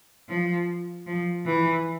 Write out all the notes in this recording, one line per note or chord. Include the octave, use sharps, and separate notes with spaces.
F3
F3
E3